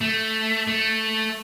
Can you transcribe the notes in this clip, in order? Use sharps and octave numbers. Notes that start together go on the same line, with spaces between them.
A3
A3